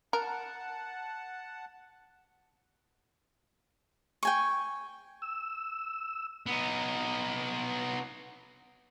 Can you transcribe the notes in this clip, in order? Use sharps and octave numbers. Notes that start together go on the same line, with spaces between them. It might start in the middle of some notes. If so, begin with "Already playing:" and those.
A#4 F#5 A5
G5 G#5 C#6
E6
B3 D#4